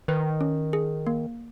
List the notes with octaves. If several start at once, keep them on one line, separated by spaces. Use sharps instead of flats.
D#3 B4
C#4
G#4
A#3